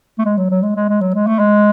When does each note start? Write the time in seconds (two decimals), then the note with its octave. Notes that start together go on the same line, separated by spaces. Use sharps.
0.19 A3
0.25 G#3
0.38 F#3
0.51 F#3
0.63 G#3
0.76 G#3
0.89 G#3
1.01 F#3
1.15 G#3
1.27 A3
1.39 G#3